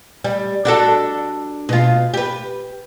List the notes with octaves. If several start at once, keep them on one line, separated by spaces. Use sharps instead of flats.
G3
D4 F#4 A4
B2 F4
G4 B4